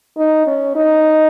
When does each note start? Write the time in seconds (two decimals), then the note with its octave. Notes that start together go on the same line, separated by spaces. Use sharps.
0.18 D#4
0.47 C#4
0.76 D#4